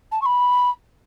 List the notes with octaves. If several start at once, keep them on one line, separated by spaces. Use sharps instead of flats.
A5
C#6
B5